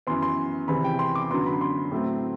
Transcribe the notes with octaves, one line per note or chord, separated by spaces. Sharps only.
F#2 E3 B3 C6
C6
E2 C3 E3 B5
G5
C6
D6
F#2 D3 F#3 B3 C6
B5
C6
A2 F#3 A3 C4